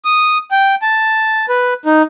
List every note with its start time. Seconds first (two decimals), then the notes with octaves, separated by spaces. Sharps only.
0.05 D#6
0.51 G5
0.82 A5
1.49 B4
1.86 D#4